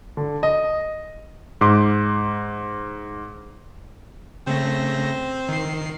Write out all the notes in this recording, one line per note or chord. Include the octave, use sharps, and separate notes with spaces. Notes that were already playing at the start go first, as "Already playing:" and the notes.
D3
D#5
G#2 C6 D6
C#3 A3 C4 A#6
D#3 C7